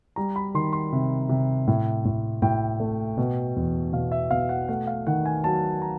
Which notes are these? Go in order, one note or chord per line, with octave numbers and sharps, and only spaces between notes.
G3 A#5
B5
D#3 C6
C6
C3
C3
A2
A2
A2 G5
A3
B2
E2
B2 F5
E5
B2 F5
F#5
A3 F#5
F5
D#3 F#5
G#5
F#3 A5
A#5